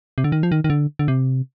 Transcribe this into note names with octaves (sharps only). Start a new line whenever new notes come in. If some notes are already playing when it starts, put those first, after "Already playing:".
C3
D3
D#3
F3
D#3
D#3
D3
D3
C3